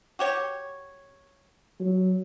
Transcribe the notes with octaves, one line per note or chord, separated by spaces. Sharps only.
F#4 G4 C#5
F#3